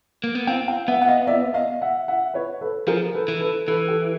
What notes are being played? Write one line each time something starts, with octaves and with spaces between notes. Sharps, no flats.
A#3
B3
C4 F5 G5
F5 G5
B3 E5 F#5
F#5
D#5 F5
D5 E5
D#5 F5
E5 F#5
E5 F#5
B4 C#5
A4 B4
F3 G#4 A#4
A4 B4
E3
A4 B4
E3 A4 B4
G4 A4